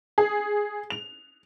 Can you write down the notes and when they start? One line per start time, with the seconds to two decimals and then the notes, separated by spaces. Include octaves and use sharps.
0.18 G#4
0.90 F7